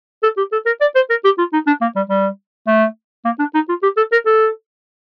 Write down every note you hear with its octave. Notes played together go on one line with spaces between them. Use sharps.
A4
G4
A4
A#4
D5
C5
A#4
G4
F4
D#4
D4
A#3
G3
G3
A3
A#3
D4
D#4
F4
G4
A4
A#4
A4